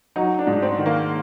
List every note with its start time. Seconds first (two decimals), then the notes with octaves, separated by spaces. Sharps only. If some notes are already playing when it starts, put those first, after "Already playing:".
0.16 F#3 D#4
0.39 D4
0.47 G#2
0.62 C4
0.78 D#3
0.86 A#3